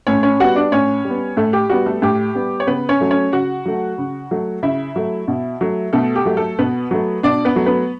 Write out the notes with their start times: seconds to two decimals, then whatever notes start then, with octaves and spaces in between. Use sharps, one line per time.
0.07 A2 C#4 C#5
0.23 C#4 C#5
0.40 G3 B3 F#4 F#5
0.56 D4 D5
0.72 A2 C#4 C#5
1.05 G3
1.10 B3
1.37 A2 A3 A4
1.53 G4
1.70 G3 B3 F#4
1.86 A3 A4
2.02 A2 G4
2.35 G3 B3
2.60 C#5
2.67 C#3 B3 B4
2.89 C#4 C#5
3.01 F#3 A3
3.11 C#4 C#5
3.33 C#3 F#4 F#5
3.65 F#3 A3
3.98 C#3
4.31 F#3 A3
4.63 C#3 E4 E5
4.96 F#3 A3
5.28 B2
5.61 F#3 A3
5.93 B2 A3 A4
6.16 G4
6.25 F#3 A3
6.37 A3 A4
6.59 B2 B3 B4
6.91 F#3 A3
7.23 B2 D4 D5
7.45 B3 B4
7.56 F#3 A3
7.66 B3 B4